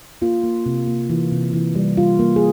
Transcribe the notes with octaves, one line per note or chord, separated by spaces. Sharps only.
A#3 F4
A#3
C3
A#3
E3
C3
E3
G3
G3 F4
A#3
G#4